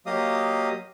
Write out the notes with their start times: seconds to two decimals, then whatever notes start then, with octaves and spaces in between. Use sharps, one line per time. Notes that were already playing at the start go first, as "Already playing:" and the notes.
0.06 F#3 A#3 G4 D#5 F5 D#6